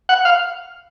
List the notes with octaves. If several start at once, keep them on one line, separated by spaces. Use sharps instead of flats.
F#5
F5